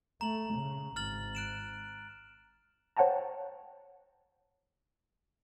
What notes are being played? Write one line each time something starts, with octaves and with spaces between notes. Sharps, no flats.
A3 A#5 F#7
C#3
G#1 F6 A6 F#7
F#6 D7 E7
C5 C#5 F#5 G5 A5 A#5